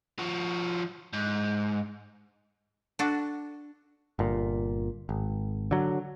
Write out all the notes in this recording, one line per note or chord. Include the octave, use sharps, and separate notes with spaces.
F3 F#4
G#2
D4 F#4 A4
G1 A#2
G#1
D3 F#3